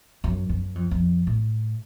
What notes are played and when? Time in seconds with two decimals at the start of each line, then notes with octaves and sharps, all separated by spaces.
0.24 F#2
0.49 F#2
0.75 F2
0.91 F2
1.27 A2